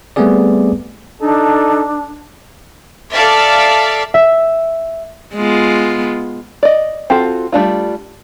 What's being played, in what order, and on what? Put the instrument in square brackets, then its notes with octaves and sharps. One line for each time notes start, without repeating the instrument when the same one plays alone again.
[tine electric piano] G3 A3 B3 C4 G#4 D5
[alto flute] D4 [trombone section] D#4 A4
[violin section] A4 D5 E5 F5
[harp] E5
[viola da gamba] G#3 B3 F4
[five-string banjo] D5 D#5
C4 F4 F#4 A4
G3 A3 D4 F4